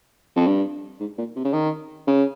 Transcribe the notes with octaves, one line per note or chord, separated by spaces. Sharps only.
F2
G2
G#2
A#2
C3
C#3
D#3
C#3